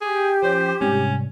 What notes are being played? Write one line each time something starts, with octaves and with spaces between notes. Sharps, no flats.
G4 G#4
F3 C#4 C5
G#2 C3 G3 C#4